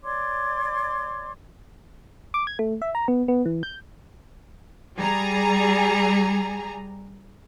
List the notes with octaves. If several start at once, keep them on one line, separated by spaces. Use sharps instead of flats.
C#5 D5 C6 D6
D6
G#6
A3
E5
A#5
B3
B3
E3
G6
G3 G#4 A#5